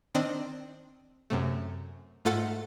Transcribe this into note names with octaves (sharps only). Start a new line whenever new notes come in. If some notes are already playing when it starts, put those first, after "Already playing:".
D#3 C4 D4 D#5
F#2 C3 A3
G#2 A3 F4 A4 F#5 A6